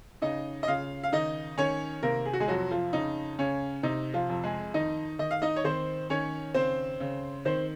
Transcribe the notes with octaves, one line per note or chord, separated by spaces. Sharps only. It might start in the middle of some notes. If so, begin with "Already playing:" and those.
C#3 D#4 D#5
D#5
C#3 F4 F5
F5
D#3 D#4 D#5
D#3 C#4 C#5
C3 A#3 A#4
G#4
F#4
G#3 G#4
F2 F#3 F#4
F3 F4
C#3 D#4
C#3 C#4
C3 D#4
F3 F4
F2
G#3 G#4
D#3 D#4 D#5
D#3 D#5
F5
D#4 D#5
C#5
D#3 C4 C5
D#3 C#4 C#5
C#3 C4 C5
C#3
D#3 C4 C5